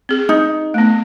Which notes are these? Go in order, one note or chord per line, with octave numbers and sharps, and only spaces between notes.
C4 G#4
D#4
A3 B3